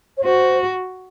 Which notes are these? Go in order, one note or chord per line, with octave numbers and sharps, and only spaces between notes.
C#5
F#4 C5